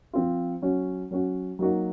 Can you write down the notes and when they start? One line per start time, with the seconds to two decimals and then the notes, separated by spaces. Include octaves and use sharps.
0.13 F3 C4 F4
0.62 F#3 C#4 F#4
1.11 F#3 C#4 F#4
1.59 F#3 A#3 D#4 F#4